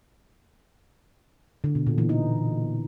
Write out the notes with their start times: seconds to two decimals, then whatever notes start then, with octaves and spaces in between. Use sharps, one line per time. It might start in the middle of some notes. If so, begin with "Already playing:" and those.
1.64 D3
1.75 B2
1.87 A#2
1.98 E3
2.09 D#4